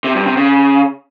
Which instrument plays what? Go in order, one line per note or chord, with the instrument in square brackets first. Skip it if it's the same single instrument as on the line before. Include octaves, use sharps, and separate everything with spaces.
[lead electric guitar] C3
G2
C3
C#3